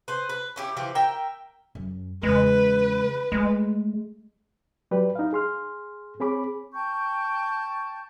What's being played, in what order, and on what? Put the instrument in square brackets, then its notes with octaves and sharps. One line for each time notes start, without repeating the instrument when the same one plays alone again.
[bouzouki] B4 C5
B4
C#4 E4 G4
E3 F3 G4
A#4 E5 G5
[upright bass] F#2
[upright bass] E2 C#3 [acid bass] G#3 [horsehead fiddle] B4
[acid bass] G#3 [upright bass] A3
[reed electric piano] F#3 G4 B4 D5
D#4 F5
G#4 C6 F6
C4 G#4 C#5 B5 D6
[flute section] G5 A5 C#6 G6